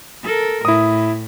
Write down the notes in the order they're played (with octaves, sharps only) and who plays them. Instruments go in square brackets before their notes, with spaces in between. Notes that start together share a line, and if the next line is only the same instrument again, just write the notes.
[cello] A4 A#4
[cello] A2 [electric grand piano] E4 D#6